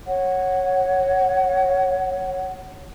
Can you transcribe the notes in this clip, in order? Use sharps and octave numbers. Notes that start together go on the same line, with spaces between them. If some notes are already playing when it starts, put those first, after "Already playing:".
C#5 F#5